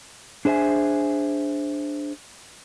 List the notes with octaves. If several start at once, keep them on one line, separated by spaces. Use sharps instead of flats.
D4 G#4 C5 E5 G#5